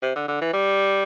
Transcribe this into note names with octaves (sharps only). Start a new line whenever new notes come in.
C3
D3
D3
E3
G3